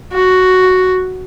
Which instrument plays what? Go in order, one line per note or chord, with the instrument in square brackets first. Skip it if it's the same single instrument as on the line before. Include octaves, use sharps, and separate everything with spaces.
[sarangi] F#4